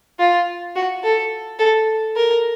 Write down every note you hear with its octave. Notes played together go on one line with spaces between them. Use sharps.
F4
F#4
A4
A4
A#4